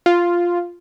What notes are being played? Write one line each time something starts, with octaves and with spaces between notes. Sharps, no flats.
F4